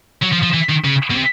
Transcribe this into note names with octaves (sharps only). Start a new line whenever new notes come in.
F#3
F3
F3
E3
D#3
C#3
B2
C3